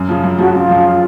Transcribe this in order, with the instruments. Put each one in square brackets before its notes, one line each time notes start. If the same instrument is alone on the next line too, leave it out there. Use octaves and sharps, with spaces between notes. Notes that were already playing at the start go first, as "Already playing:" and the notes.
Already playing: [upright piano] F#2
C#3 F3
F#2
[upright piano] C#3 F3 [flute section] F#4
[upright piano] F#2 [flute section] F4
[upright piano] C#3 F3